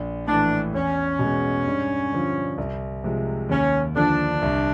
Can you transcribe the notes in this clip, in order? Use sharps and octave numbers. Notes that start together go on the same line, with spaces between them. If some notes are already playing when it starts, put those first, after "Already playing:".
Already playing: A#1
A2 E3 D4
E2 C#4
B2
G#3
G2
D3 F3
C2
C3 F3 G#3
D#2 C#4
D3 F3 D4
C2